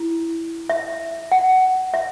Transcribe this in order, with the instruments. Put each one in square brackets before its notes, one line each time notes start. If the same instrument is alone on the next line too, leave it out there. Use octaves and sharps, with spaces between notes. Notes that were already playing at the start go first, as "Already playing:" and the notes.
Already playing: [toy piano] E4
E5
F#5
E5